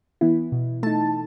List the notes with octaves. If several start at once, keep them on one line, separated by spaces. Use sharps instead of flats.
E3 B3 E4
B2
A3 D#4 A5